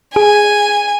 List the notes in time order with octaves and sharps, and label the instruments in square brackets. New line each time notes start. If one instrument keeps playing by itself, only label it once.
[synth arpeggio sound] G#4 [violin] G#5